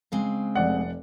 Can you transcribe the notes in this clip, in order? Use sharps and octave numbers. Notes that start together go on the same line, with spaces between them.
C#3 G#3 C4
F1 D5 F#5